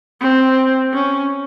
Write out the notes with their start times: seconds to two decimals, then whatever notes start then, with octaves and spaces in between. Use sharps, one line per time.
0.21 C4
0.94 C#4